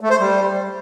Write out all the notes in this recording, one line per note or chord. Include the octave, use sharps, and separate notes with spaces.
A3
C5
G3